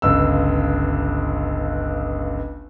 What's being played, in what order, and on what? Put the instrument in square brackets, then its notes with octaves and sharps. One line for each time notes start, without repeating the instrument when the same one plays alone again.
[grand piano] G1 C#2 E6